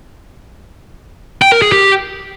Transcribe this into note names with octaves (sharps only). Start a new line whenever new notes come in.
G5
A#4
G#4
G4